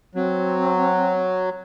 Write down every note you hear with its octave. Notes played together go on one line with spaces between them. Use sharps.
F#3 C4